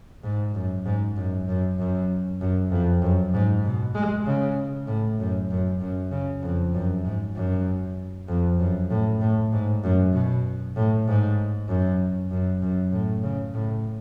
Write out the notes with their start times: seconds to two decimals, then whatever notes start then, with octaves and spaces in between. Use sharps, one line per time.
0.23 G#2
0.55 F#2
0.86 G#2
1.17 F#2
1.48 F#2
1.79 F#2
2.41 F#2
2.71 F2
3.02 F#2
3.33 G#2
3.65 B2
3.95 G#3
4.26 C#3
4.87 A2
5.19 F#2
5.50 F#2
5.80 F#2
6.12 C#3
6.43 F2
6.74 F#2
7.04 G#2
7.36 F#2
8.28 F2
8.59 F#2
8.90 A2
9.21 A2
9.52 G#2
9.83 F#2
10.14 B2
10.76 A2
11.07 G#2
11.69 F#2
12.31 F#2
12.62 F#2
12.92 A2
13.23 C#3
13.54 A2